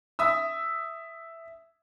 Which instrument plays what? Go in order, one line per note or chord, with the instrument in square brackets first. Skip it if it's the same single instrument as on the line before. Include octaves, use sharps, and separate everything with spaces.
[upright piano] E5 D#6 E6